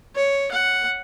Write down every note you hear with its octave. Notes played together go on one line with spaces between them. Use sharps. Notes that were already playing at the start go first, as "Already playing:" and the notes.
C#5
F#5